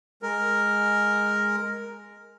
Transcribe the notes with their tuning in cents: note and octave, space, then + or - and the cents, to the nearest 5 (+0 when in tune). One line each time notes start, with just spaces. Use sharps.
G#3 +0 A#4 +0